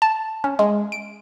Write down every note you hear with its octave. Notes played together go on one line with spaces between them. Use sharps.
A5
C#4
G#3
D7